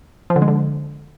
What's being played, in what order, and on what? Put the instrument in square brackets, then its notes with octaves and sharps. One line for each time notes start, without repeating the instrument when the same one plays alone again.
[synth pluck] F3
D3
G#3
D3